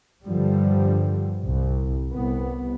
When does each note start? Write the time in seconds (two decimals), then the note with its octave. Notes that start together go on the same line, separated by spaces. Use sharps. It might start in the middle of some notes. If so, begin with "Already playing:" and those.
0.24 G2 D3 F3 G3
1.44 C2
2.12 C2 B3